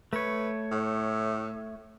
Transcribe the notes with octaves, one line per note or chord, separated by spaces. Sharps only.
A3 B4 C#5
A2